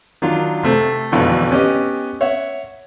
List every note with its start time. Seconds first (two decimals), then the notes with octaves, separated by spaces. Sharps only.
0.22 D#3 F#3 D4 F4
0.63 C3 A3 C5
1.12 G#1 F2 B2 D3 E3
1.51 B3 C#4 G4 D#5
2.21 C#5 E5 F#5